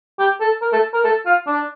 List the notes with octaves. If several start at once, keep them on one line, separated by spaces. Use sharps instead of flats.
G4
A4
A#4
A4
A#4
A4
F4
D4